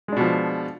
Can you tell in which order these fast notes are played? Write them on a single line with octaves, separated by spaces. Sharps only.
G#3 D4 B2 F3